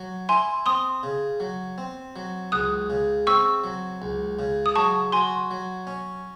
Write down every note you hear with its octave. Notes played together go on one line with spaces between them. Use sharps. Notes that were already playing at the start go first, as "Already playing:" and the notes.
Already playing: F#3
E4 G#5 C6
C4 C6 D#6
C#3
F#3
C4
F#3
C#2 D#6 F#6
C#3
C4 C#6 E6
F#3
C#2
C#3
D#6
F#3 A5 C#6
F#4 G#5 C6
F#3
C#4